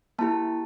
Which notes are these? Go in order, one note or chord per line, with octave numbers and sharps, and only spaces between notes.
A#3 E4 G4 A5